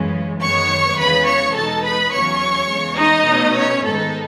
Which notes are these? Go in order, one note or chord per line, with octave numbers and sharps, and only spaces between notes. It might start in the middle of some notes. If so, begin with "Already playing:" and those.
Already playing: F#2 C#3 E3 G#3 C#4
F#2 D#3 G#3 B3 C#5 C#6
E2 C#3 E3 G#3 B3 B4 B5
C#5 C#6
E2 B2 G#3 D#4 A4 A5
B4 B5
E2 C#3 F#3 C#4 C#5 C#6
E2 C#3 G#3
D#4 D#5
B2 A3 C#4
C#4 C#5
G#2 D#3 G#3 B3 D#4 A4